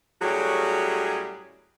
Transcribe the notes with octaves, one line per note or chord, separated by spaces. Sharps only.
A2 F#3 G3 C#4 F#4 G#4